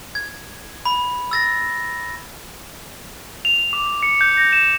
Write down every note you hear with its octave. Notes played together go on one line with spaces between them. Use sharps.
G#6
B5
E6 A6 A#6
F7
D6
C#7
G6
A#6
E7